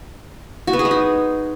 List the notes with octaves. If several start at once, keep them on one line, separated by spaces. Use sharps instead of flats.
F#4
B3
G#4
G#3
D#4